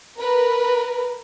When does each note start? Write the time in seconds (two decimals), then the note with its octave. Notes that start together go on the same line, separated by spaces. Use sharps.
0.18 A#4 B4